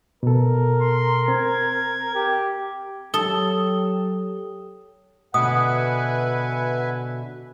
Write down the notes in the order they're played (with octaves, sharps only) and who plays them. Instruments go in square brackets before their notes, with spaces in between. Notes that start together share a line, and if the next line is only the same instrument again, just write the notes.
[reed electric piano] B2 A4 [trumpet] A#4
[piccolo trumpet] C6
[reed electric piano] C4 [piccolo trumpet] G#6
[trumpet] G4
[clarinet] F#3 [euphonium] G4 [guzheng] A4 [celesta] D#6 G7
[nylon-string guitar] B2 D3 [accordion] B4 E5 G#5 [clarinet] F#5 [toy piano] D#6